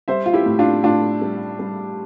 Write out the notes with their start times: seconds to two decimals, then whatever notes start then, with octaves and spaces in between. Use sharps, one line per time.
0.08 G3 C5 E5
0.26 F4
0.33 E4 G4
0.46 A2
0.59 D4 F4
0.84 A2 D4 F4
1.21 G3
1.59 G3